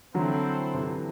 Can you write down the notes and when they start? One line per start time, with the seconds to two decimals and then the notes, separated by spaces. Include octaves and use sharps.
0.14 D3 F#3 C4 E4 A4 C5
0.74 C3 E3